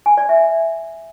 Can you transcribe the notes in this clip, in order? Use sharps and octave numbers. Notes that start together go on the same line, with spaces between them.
G#5
D5
E5